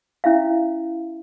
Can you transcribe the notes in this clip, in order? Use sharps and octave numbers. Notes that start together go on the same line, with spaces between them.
C#4 E4 E5 F5